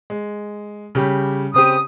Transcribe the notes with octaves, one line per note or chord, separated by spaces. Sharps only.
G#3
C#3 G3 G4
C#3 C4 G4 D#6